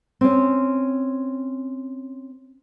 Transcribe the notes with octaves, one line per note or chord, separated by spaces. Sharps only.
C4 C#4